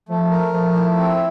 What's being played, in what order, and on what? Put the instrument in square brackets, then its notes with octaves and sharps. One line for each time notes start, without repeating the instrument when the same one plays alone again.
[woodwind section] F3 [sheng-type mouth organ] A3
[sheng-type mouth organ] A#4
[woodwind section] F3 [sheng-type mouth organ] A3
[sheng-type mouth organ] E4
C4